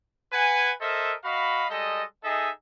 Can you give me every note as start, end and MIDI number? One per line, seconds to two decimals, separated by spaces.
0.32 0.71 71
0.32 0.71 78
0.32 0.71 80
0.81 1.14 69
0.81 1.14 70
0.81 1.14 72
0.81 1.14 75
0.81 1.14 76
1.25 1.67 66
1.25 1.67 75
1.25 1.67 77
1.25 1.67 83
1.70 2.03 55
1.70 2.03 56
1.70 2.03 69
1.70 2.03 75
2.24 2.50 63
2.24 2.50 68
2.24 2.50 69
2.24 2.50 75
2.24 2.50 76